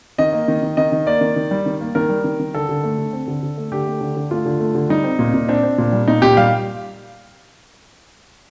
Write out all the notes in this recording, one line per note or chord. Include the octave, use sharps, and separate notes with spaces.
D#3 D#5
A#3
D#3
D#3
D#3 D#5
D#3
A#3 D5
D#3
D#3
G3
D#3
A#3
D#3 A#4
G3
D#3
D#3
D3 A4
D3
A3
D3
C4
D3
D3
A3
D3 G4
A3
D3
D3
A3 F4
D3
A3
D3
G3 D#4
C4
A#2
A#2
C4 D4
C4
A#2
G3
A#2 D#4
A#2 G4
G3 F5